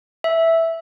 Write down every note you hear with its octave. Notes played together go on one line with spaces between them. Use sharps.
E5